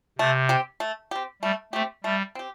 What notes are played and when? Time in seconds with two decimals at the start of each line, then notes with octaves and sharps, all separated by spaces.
0.19 C3 A3
0.49 C4 G4
0.80 A3
1.11 C4 G4
1.42 G3 A3
1.73 A3 C4 G4
2.04 G3 A3
2.35 C4 G4